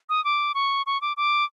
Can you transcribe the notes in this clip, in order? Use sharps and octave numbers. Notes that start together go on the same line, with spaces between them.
D#6
D6
C#6
C#6
D6
D6